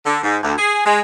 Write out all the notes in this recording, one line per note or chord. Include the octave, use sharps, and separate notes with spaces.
D3
G#2
D2
G#4
G#3